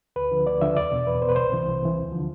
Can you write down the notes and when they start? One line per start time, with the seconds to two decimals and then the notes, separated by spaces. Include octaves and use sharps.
0.16 D2 B4
0.31 D3 F3
0.47 D2 D5
0.61 D3 F3 E5
0.76 E2 D5
0.92 B2
1.06 E2 B4
1.22 B2 C5
1.29 B4
1.36 C2 C5
1.52 C3 E3
1.67 C2
1.82 C3 E3
1.97 D2
2.12 D3 F3